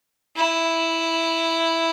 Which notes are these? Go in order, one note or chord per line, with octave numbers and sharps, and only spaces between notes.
E4